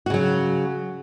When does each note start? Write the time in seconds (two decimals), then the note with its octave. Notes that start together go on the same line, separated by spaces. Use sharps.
0.06 F#4
0.10 C#3
0.14 F#3